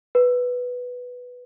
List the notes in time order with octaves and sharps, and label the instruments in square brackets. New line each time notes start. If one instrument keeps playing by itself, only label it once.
[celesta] B4